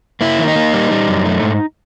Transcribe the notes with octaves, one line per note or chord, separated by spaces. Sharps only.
A#3 E4
D#3
D#4
A#3
G3
G3
F#2
A3
G#2